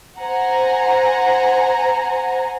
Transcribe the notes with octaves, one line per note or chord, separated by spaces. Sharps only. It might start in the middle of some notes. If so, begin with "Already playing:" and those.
C5 F#5 G#5 A#5